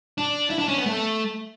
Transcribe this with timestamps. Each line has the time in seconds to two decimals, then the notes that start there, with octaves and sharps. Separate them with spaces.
0.18 D4
0.50 E4
0.59 D4
0.68 C#4
0.77 B3
0.86 A3